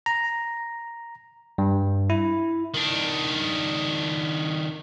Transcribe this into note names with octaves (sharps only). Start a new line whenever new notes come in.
A#5
G2
E4
D#3 D4